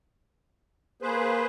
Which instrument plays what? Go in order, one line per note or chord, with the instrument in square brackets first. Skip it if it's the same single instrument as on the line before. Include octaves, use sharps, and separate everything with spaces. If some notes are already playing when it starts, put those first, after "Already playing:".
[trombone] A#3 [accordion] G#4 B4 C5